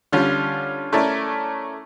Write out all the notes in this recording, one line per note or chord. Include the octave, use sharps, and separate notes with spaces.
D3 G3 C#4 F4
A3 C#4 E4 A#4 D5